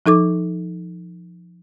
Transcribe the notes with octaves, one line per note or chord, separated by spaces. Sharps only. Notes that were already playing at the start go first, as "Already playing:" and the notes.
F3 D#4 A4 D6